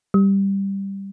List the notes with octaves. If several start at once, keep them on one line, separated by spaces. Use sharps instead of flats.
G3